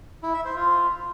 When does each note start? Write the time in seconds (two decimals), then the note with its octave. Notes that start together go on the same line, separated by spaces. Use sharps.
0.23 E4
0.34 E5
0.45 C5
0.56 F4